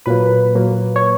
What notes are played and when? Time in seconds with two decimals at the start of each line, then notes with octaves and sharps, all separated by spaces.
0.06 A#2 F#3 A#3 B4
0.55 A#2 F#3 A#3
0.96 C#5